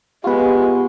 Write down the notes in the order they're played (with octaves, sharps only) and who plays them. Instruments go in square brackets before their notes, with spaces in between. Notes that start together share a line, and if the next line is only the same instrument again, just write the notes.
[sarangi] G#3 [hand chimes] B3 F#5 C#6 [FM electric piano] F4 B4 [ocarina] G4